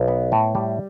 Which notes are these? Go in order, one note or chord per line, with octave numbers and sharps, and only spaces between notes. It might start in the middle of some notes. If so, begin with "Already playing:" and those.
Already playing: B1
B3
A2
G3